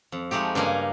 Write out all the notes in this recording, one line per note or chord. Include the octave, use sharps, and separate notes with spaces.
F2
F3 G#3 A3 D#4 G4
G2 C#3 A#3 D#5 G#5